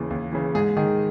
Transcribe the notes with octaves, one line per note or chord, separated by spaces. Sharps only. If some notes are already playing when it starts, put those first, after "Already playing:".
Already playing: D#2 C#3 E3
D#2
C#3 E3
G#2 G#4
D#3 G#4